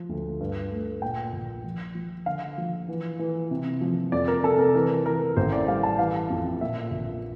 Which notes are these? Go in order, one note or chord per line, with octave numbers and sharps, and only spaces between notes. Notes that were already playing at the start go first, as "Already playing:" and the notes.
Already playing: F3
D2
G2
A3
A#2 G5
A#1
F3
F3
D3 F5
F3
E3
E3
C3
F3
F2 D5
A#4
C3 A4
A#4
E3 A#4
E3 A#4
A1 C5
D5
G3 F5
A5
E3 F5
F2
A#2 E5
A#1